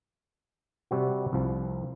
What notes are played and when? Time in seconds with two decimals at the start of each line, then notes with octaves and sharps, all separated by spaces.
0.91 C3 G3 C4 F#4
1.33 C2 F3